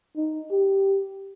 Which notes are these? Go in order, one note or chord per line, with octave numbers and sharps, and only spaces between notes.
D#4
G4